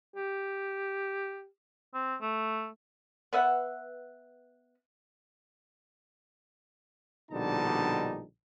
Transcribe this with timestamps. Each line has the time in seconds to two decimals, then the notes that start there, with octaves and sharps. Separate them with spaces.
0.16 G4
1.94 C4
2.21 A3
3.33 B3 B4 E5 F#5
7.31 A#1 B2 D3 G3 D#4 A5